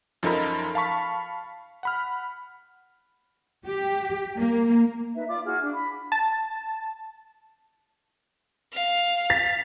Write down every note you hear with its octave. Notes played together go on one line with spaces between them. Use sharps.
F#2 F3 D#4 A4 A#4 B5
F5 A5 B5 C#6 B6
F#5 B5 F6
G4
A#3
D#4 B4 E5
F4 D5 D6
E4 F#4 G#4 F6
D4
B5
A5
F5
A6 B6